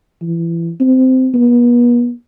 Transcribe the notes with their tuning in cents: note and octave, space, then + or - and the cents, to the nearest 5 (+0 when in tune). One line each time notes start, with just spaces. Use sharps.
E3 +25
C4 -15
B3 -40